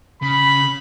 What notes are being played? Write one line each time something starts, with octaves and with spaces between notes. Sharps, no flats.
C#3 B5